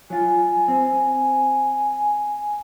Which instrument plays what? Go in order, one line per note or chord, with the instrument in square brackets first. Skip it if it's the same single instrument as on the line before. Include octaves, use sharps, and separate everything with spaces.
[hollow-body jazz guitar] F#3 F4 [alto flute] G#5
[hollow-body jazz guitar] C4